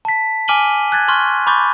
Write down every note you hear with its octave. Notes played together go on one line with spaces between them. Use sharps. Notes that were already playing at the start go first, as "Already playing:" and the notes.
A5 B6
G#5 D6 F6 D#7 F#7 G7
F#6 G#6 A6
C6 C#6 F6
B5 C#6 D6 G6 A6